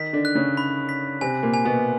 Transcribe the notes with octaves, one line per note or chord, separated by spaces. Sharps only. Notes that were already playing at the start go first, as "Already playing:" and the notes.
Already playing: D#3 D#4 B6
D3 D4
F#6
C#3 C#4
B5
B6
C3 C4 G#5
A#2 A#3
G#5
B2 B3